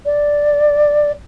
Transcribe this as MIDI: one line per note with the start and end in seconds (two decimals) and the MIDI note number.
0.05 1.11 74